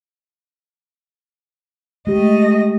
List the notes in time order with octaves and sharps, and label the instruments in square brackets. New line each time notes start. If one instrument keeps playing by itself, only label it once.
[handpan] G#3 G4 [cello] A3 D#5